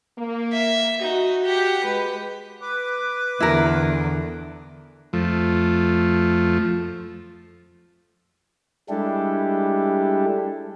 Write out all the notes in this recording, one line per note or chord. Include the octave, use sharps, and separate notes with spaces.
A#3
E5
D#4 F#4
G4 F#5
G#3 G4 B4
B4 D6
E2 D3 E4 A#4
F2 F3 A3
G3 G#3 D4 E4 G4 A4